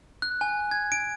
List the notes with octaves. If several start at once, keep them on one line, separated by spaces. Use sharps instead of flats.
F#6
G#5
G#6
D7